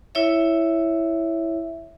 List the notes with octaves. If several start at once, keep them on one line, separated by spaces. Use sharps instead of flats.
E4 C#5 E5